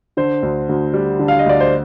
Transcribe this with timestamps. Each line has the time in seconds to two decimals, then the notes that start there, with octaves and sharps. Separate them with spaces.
0.17 D3 C5
0.43 D2
0.69 D2
0.94 G3
1.19 D3
1.28 F5
1.39 D#5
1.46 D2 D5
1.60 C5